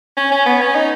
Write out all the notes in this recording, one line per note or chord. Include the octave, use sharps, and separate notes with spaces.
C#4
C#4
B3
C#4
D#4